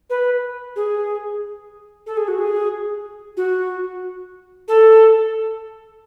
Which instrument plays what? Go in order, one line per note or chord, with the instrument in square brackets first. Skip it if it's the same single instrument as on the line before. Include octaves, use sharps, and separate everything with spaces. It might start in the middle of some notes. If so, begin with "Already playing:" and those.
[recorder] B4
G#4
A4
G#4
F#4
G#4
F#4
A4